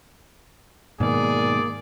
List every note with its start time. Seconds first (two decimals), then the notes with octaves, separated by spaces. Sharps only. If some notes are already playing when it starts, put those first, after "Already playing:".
1.00 G#2 B2 D#3 A#3 G#4 D5